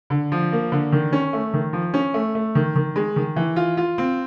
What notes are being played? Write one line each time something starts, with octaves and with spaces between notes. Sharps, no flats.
D3
F3
A#3
D3
D#3
C#4
A3
D#3
F3
C#4
A3
A3
D#3
D#3
G#3
D#3
E3
F4
F4
C4